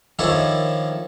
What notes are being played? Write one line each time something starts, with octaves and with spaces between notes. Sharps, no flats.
D#3 F3 D4 E4 A4 C#5